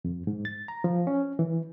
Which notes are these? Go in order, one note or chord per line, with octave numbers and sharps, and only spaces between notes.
F2
G#2
A6
A#5
F3
C#4
E3